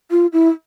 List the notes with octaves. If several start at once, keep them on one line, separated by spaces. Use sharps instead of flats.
F4
E4